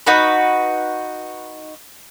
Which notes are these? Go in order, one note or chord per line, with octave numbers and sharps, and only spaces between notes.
D#4 F#4 B4